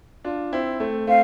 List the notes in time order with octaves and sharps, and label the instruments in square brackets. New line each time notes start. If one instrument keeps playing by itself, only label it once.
[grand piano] D4 F4
C4 E4
A3 C4
[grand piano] A3 C4 [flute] F5